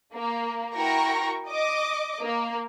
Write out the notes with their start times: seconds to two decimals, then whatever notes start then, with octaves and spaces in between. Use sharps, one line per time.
0.14 A#3
0.75 E4 F#4 A#4 G5 C#6 A#6
1.49 D#5 D6
2.21 A#3